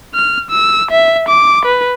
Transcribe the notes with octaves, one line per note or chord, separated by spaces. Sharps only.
F6
E6
E5
D6
B4